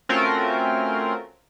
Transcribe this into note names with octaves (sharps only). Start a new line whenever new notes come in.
A3 C4 C#4 F4 F#4 A#4